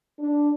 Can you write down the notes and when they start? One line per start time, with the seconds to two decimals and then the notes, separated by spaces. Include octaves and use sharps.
0.20 D4